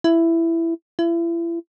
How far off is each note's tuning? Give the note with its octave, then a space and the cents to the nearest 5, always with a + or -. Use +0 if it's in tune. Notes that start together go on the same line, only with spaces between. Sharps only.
E4 +10
E4 +35